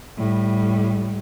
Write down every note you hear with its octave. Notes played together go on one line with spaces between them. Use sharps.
A2 G3